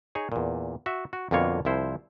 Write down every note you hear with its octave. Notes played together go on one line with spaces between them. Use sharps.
D#4 G#4 C#5
E2 A#2
F#4 E5
F#4
F2 B2 D3 A#3 F4 C#5
C2 F3 E4 C5